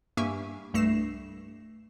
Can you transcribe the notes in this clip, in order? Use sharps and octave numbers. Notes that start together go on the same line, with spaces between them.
G2 A#3 G4 E5 G#5 C#6
C2 G2 A3 A#6 C7 E7